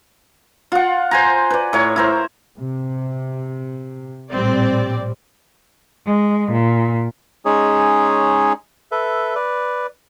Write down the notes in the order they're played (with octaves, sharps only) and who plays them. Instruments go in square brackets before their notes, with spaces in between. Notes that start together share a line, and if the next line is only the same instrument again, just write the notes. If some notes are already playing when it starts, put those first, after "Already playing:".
[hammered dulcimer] F4 F#5
C5 G#5 A#5
B4 D5
A2 C#5 A#5
E4 A#4 C5
[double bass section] C3
[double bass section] A#1 A2 G3 [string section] C4 D5
[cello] G#3
A#2
[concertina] G#3 C#4 D#4 G#4 C#5
A4 B4 E5
B4 D5